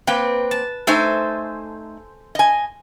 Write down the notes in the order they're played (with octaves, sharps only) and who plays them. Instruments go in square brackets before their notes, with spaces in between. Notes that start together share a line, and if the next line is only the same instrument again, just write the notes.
[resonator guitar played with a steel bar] A#3 C4 G5 [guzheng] B4
[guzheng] A5
[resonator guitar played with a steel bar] A3 D#4 [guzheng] A4 C5 G#5
[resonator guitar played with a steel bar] D#5 G#5